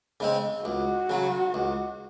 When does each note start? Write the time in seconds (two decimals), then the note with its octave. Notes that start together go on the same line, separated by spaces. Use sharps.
0.20 C#3 G#3 C4
0.65 C#2 F#4
1.10 C#3 F#3
1.54 C#2